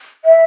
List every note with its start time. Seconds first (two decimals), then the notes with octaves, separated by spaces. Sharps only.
0.24 E5